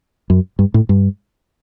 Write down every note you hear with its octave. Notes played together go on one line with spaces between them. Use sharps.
F#2
G2
A2
G2